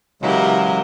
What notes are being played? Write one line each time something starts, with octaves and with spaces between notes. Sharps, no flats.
C#3 E3 F#3 G#3 G4 A#4